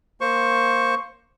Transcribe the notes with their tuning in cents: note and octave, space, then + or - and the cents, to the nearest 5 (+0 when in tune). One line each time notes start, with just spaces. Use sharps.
A#3 +0 C5 +10 C#6 +0